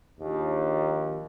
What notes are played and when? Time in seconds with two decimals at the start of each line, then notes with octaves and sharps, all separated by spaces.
0.20 A#1 D#2